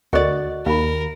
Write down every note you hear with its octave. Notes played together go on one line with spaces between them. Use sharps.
D2 F#4 A4 A#4 D5 D#5
D#2 A#4 F5 B5